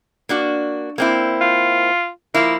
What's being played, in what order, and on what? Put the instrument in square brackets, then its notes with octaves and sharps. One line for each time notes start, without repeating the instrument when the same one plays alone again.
[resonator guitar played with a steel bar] A#3 D4 F#4
A#3 C4 E4
[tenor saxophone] F4
[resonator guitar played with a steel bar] F3 E4 [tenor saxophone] A#3